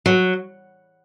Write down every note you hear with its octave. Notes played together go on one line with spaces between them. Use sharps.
F#3